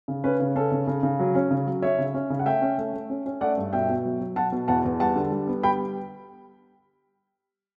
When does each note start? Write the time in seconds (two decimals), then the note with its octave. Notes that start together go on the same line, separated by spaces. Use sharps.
0.08 C#3
0.24 C#4 B4
0.40 C#3
0.56 C#4 A4
0.72 C#3
0.87 C#3
1.03 C#3
1.19 F#3
1.35 C#4
1.51 C#3
1.67 F#3
1.82 C#4 C#5 E5
1.98 C#3
2.14 C#4
2.30 C#3
2.39 F#5
2.46 A3 E5 G5
2.62 C#4
2.78 A3
2.93 A3
3.10 C#4
3.26 C#4
3.41 A3 D5 F#5
3.57 G2
3.73 B2 E5 G5
3.89 B2
4.05 F#3
4.20 F#3
4.36 B2 F#5 A5
4.52 B2
4.68 E2 F#5 A5
4.85 E2
5.00 G3 F#5 A5
5.16 D3
5.32 G3
5.47 B3
5.63 G3 G5 B5